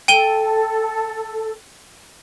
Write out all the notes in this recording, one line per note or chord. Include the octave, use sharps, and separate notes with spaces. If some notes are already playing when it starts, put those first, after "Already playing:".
A4 G5 D#7 G7